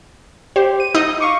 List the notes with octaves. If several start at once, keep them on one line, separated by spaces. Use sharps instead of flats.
G4 C5
D#7
D#4 D#5 D#6
F5 C#6 D6